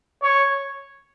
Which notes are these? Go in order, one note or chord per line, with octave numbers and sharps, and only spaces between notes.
C#5